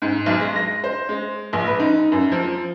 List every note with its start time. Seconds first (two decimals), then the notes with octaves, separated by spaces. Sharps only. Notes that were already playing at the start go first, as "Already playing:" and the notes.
0.02 G#2
0.26 B1
0.40 G#3
0.56 A#6
0.84 C5
1.09 G#3
1.53 A#1
1.67 B4
1.79 D#4
2.12 F#2
2.32 F3